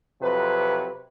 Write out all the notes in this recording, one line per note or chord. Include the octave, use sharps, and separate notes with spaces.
F2 C3 F#3 B4